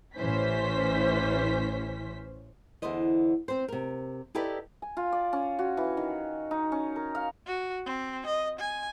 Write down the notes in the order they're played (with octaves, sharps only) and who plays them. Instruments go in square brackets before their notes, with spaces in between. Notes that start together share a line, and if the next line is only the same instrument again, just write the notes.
[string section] A1 E3 C#4 C5 B6
[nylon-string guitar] E2 D3 E4 C5 D#5
C4 C5
C3 A#4
D#4 E4 G4 A4 B4 D5
[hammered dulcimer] G#5
F4
D5
C#4
F#4
E3
D#3
D#4
C#4
A#4
F5
[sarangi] F#4
C4
D#5
G#5